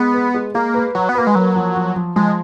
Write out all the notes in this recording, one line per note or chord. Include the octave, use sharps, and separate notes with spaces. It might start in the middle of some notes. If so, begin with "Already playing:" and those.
Already playing: G#3 B3
B4
G#3
G#3 A#3
B4
F#3 F#4
B3
A#3 B4
G#3
F#3 A#3
F3
F3
F3
F3 G#3